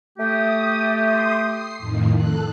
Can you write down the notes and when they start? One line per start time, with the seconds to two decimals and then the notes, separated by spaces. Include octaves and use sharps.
0.18 A3 G4 D#6
1.02 C6 D#6
1.45 C7
1.78 F2 A2 D#3
2.14 A4 F#6